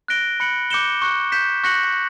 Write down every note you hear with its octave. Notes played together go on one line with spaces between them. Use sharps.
F#6 A#6 D7 G7
B5 F#6 C#7 F#7
D6 G6 C#7 E7 G7
C#6 F#6 C#7
G6 B6 E7
C#6 F#6 A#6 C#7 F#7